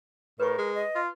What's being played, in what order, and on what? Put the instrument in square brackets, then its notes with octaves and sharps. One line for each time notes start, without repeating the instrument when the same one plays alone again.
[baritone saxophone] A2 [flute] A#4 [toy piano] B4 C#6
[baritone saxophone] G#3
[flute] D#5
[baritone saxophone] F4